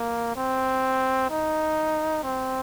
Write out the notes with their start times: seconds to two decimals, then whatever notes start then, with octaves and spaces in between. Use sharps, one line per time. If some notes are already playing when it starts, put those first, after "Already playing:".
Already playing: A#3
0.36 C4
1.30 D#4
2.23 C4